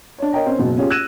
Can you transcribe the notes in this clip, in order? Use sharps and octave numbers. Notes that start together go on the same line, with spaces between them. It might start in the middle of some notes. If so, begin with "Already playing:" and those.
D4 C#5
A#4 C#5 D#5 G5 A#5
C4 C#4
F#1 B2 F#3
C#4 F4 G4 G#4
E6 F#6 G#6 A#6 D#7 E7